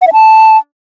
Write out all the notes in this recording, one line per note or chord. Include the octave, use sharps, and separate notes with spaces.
F#5
E5
A5